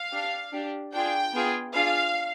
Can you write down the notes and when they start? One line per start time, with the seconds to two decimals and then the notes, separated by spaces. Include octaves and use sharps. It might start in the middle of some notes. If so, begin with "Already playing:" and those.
Already playing: F5
0.12 D4 G4
0.53 D4 G4
0.93 D4 F4 G#4 G5
1.33 B3 F4 G#4
1.74 D4 F4 G#4 F5